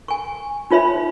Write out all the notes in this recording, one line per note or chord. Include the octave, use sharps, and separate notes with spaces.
G#5 C#6
D#4 F4 C#5 E5 B5